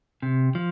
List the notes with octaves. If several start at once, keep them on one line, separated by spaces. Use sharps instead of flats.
C3
F3